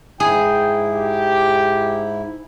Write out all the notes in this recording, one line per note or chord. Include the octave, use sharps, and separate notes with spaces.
G#2 E4 G#4 G5
G4